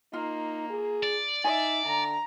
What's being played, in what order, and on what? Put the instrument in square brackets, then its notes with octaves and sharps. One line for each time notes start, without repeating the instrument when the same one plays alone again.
[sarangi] A#3 [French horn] D#4 [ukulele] F4
[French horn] G#4
[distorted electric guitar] D5
[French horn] D#4 [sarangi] E5 [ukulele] G#5
[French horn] D3 [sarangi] A#5